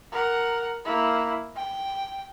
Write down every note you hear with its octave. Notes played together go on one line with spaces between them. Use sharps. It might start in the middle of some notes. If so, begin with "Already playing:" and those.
A#4 F#5
A#3 E4
G5